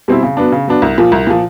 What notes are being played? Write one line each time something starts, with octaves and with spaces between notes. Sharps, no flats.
B2 G3 C4 E4
C#3
F#3 B3 D4
C#3
F#3 B3 D4
C2
A#2 F3
C2
A#2 F3